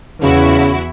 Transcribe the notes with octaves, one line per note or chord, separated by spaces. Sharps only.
E2 C#3 E4 F#4